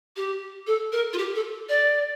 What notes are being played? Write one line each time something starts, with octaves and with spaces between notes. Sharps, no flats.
G4
A4
A#4
F4
G4
A4
D5